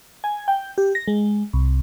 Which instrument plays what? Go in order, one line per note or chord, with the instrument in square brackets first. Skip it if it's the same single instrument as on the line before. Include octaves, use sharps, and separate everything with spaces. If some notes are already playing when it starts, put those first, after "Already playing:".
[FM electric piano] G#5
G5
G4
A#6
G#3
C2